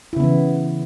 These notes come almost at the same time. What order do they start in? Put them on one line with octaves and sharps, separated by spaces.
E4 C#3 B3 E3